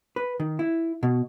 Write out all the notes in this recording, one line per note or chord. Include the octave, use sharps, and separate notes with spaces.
B4
D#3
E4
B2